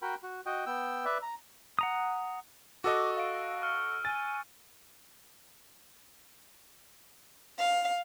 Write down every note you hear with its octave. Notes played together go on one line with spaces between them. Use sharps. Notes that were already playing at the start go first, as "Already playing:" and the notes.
F#4 A#4 G5 B5
F#4
F#4 D#5 G5
B3 G5 E6
B4 D5 E5
A#5
F#5 A#5 D#6
F#4 A4 D#5 C#6 D6 E6 F#6
F5 C#6 D7
C#6 F6 C#7
G#5 F6 A6 D#7
F5